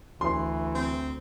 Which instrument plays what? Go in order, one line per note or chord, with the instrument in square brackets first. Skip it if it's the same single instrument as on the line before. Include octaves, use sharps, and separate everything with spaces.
[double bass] D2 [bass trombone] E3 [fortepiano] C6
[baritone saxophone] C4